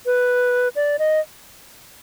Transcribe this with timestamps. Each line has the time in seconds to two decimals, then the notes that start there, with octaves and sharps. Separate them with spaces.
0.06 B4
0.76 D5
0.99 D#5